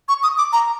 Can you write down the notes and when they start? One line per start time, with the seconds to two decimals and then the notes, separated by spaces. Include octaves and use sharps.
0.09 C#6
0.23 D#6
0.38 D6
0.53 A#5